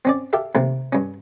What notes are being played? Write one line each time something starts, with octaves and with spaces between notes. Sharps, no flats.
C4 C#4 D5
G4 A4 E5 F5
D#2 C3 A3 C4
G2 C#4